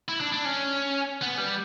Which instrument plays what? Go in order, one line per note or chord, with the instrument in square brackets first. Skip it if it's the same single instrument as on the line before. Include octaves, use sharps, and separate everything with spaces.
[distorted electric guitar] E4
D4
D4
C#4
B3
G3